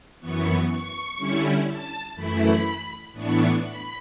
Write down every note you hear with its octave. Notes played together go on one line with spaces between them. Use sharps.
F#2 E3 B3 C#6
C#6
D3 G3 C#4 E4
A5
F#2 E3 A3 E4 B5
A2 E3 B3 D4 C#6
B5